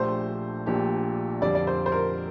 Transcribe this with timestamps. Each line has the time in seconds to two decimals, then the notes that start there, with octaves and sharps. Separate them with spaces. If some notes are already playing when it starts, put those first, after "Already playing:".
Already playing: A#1 A#2 A3 D4 G4 C5
0.66 A#1 A#2 A3 D4 G4
1.42 F2 D3 G3 D5
1.55 D5
1.67 C5
1.86 C5
1.92 A#4